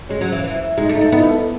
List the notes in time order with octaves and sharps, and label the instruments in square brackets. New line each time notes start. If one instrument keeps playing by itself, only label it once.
[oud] G#3 [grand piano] C#4
[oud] F#3
E3
E3
[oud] G#3 [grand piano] D#4
[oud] A3
[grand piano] D#4
[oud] A3
[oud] B3 [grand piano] D#4
[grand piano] E4
A4